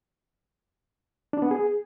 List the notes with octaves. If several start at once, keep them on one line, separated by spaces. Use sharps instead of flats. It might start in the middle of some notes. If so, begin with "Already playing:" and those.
D4
B3
G#4